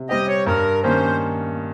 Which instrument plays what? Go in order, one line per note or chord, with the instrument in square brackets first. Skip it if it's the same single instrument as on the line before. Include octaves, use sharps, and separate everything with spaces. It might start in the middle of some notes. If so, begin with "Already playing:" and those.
Already playing: [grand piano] C3
[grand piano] G3 C4 G4 [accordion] D#5
[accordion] C#5
[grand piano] G2 [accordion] A#4
[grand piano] D#3 A#3 C#4 [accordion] C5